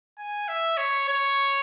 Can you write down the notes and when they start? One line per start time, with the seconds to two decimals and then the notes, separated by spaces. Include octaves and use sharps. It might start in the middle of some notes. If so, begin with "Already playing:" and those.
0.18 G#5
0.48 E5
0.77 C#5
1.08 C#5